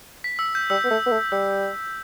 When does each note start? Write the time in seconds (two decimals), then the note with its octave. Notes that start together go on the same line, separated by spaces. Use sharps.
0.24 B6
0.39 E6
0.55 G6
0.70 G3 E6
0.84 B3
0.91 A3
1.06 B3
1.11 A3
1.32 G3 E6